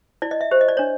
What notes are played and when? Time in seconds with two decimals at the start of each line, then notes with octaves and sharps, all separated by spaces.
0.22 E4 D5
0.31 D#5
0.41 E5
0.51 G4 C5
0.61 D#5
0.69 D5
0.77 D4 C#5